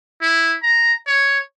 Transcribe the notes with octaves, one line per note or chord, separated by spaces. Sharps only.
E4
A#5
C#5